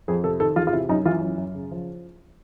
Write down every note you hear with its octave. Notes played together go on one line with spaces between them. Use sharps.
F2 G#4
C3 A4
D#3 A4
E2 F4
F4
C3 E4
F#2 D#4
E3 F4
F#2
F#2
C#3
F3